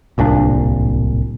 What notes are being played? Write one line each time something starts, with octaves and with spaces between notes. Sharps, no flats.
D1 C2 A#2 D4